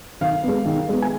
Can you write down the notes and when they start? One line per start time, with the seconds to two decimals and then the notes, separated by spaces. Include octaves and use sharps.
0.21 D#3 F5
0.43 G#3 B3
0.66 D#3
0.89 G#3 B3
1.02 G#5